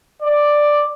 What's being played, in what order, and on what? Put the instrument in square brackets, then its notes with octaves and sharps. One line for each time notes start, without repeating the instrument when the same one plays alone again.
[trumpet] D5